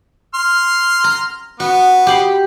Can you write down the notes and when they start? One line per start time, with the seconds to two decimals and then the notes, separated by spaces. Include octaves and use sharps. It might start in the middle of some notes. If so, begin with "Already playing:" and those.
0.34 C6 F6
1.04 A#5
1.60 B3 F#4
2.07 G4 B5 C6